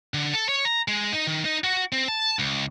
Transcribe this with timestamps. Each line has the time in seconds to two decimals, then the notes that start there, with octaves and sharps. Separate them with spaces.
0.14 D3
0.33 A4
0.49 C#5
0.65 A#5
0.88 G#3
1.12 D#4
1.27 D#3
1.45 D#4
1.64 F#4
1.93 C4
2.08 A5
2.39 C#2